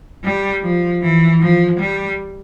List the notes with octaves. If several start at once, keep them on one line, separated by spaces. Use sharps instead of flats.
G3
F3
E3
F3
G3